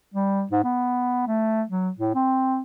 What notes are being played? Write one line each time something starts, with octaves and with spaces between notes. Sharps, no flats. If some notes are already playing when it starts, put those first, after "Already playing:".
G3
G#2
B3
A3
F#3
A2
C4